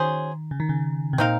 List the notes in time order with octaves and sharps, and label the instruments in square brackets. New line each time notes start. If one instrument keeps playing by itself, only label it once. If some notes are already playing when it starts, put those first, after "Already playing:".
Already playing: [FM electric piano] D#3 [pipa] F#3 C#4 G#4 C5
[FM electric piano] C#3
D#3
C#3
C3
[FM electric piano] A#2 [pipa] C4 D#4 A#4 F5